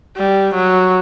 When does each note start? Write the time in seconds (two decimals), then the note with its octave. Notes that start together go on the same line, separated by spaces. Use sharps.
0.17 G3
0.55 F#3